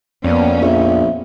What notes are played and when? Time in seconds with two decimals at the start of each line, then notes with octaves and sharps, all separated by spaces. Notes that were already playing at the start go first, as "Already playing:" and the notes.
0.24 F2 A#3 B3 C#4 D5
0.62 A#1 E5